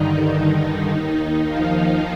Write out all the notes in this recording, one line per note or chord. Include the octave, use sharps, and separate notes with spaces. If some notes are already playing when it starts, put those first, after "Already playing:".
Already playing: G2 D3 D#3 D#4
D#2 D#3
F3 F4